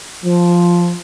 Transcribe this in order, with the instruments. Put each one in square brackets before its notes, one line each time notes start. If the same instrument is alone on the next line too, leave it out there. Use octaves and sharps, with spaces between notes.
[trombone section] F3